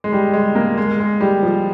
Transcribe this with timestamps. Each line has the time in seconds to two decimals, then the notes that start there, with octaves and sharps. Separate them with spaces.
0.04 G#3
0.12 G3
0.33 G#3
0.55 A#3
0.78 G#3
1.00 G#3
1.21 G3
1.43 F3